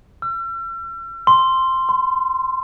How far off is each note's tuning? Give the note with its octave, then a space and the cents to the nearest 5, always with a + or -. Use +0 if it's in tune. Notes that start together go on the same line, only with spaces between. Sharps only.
E6 +45
C6 +0
C6 -35